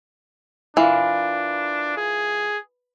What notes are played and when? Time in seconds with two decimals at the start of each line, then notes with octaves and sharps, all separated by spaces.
0.77 E3 D4 F4 A#4 F5
1.97 G#4